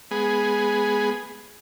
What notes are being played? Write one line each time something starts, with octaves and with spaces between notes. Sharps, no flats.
G#3 B3 G#4